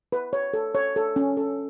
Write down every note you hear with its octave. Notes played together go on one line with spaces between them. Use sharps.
B4
C#5
A4
C#5
A4
C#4
A4